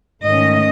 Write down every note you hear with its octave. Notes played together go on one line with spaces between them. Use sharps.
G#2 D#3 A3 C#4 D#5